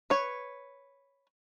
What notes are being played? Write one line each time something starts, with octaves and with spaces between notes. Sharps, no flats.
B4 C#5